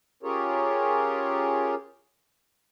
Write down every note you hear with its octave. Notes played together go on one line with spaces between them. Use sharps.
C#4 F4 G4 G#4 A#4 C#5